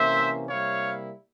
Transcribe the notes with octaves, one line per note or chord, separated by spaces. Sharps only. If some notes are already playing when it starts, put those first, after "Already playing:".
Already playing: C3 E3 A#3 C#4 C5 E5
C3 G3 A#3 E4 C#5 F5